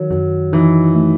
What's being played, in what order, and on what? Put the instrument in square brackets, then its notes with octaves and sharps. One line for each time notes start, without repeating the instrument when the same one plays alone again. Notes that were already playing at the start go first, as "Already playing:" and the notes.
Already playing: [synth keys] D#3 [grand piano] F#3
[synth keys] F#2 [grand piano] F#3
[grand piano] E3 [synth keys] D#4
[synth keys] A3